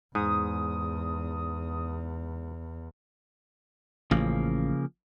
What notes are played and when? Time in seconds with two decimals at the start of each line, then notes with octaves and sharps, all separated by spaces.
0.15 E2 G#2 D#6
4.11 A1 C#3 F3 A#3